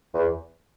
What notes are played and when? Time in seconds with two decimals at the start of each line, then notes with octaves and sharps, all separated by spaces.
0.14 E2